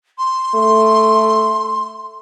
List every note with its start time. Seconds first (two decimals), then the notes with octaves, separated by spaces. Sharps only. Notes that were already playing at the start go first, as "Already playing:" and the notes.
0.18 C6
0.55 A3